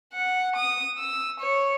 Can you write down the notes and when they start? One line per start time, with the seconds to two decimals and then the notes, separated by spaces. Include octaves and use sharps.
0.13 F#5
0.55 D#6
0.99 E6
1.40 C#5